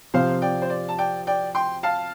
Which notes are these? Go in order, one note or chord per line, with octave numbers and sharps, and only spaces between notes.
C3 F3 C4 C5 F5
D5 G5
C5
D5
A5
D5 G5
D5 G5
G5 C6
F5 A5